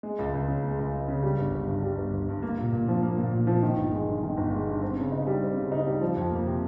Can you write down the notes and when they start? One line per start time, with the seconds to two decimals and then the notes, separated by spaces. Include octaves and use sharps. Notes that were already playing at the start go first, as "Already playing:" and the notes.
0.03 G#3
0.19 C#2
0.34 C#2
0.48 C#3
0.64 G#3
0.79 C#2
0.93 C#2
1.08 C#3
1.23 G3
1.38 G1
1.54 G1
1.68 G2
1.83 G3
1.98 G1
2.13 G1
2.29 G2
2.42 A#3
2.58 A#2
2.73 A#2
2.88 F3
3.02 A#3
3.18 A#2
3.33 A#2
3.47 F3
3.63 D#3
3.77 G1
3.92 G#3
4.07 G2
4.23 D#3
4.37 G1
4.52 G#3
4.67 G2
4.82 C4
4.97 C#3
5.12 D#4
5.27 G3
5.42 C4
5.57 C#3
5.72 D#4
5.87 G3
6.01 F3
6.17 F2
6.31 A#3
6.46 C3